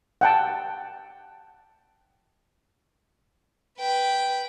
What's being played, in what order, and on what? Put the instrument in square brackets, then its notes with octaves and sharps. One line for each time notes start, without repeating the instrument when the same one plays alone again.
[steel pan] F#5 G5 A5
[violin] B4 G5